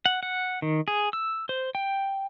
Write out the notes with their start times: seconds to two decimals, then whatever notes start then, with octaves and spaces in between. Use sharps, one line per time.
0.06 F#5
0.23 F#5
0.62 D#3
0.88 G#4
1.13 E6
1.49 C5
1.75 G5